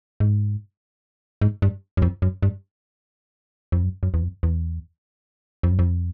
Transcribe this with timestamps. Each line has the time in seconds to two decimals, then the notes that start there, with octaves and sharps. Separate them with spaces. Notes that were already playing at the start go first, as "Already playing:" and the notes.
0.20 G#2
1.41 G#2
1.62 G2
1.97 F#2
2.02 F2
2.22 F#2
2.43 G2
3.72 F2
3.83 F#2
4.03 F#2
4.14 E2
4.22 F2
4.43 E2
5.63 F2
5.71 F#2
5.79 F2